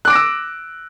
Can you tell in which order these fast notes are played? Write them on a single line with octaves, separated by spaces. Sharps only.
F#6 D6 D7 A#6 E6